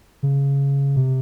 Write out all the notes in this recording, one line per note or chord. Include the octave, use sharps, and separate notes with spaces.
C#3
C3